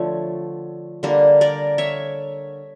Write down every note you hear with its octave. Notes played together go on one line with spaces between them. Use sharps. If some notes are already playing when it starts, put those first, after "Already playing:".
Already playing: D3 F3 A3 C#5
D3 G3 A#3
A#4 D5
C#5 E5